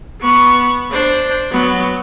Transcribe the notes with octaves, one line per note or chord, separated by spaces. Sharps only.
B3 C#6
D4 C5
F#3 B3